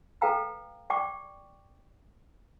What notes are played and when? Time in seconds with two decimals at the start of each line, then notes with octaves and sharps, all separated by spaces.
0.21 A4 B4 F5 G5 A#5 E6
0.90 D5 G5 C#6 D6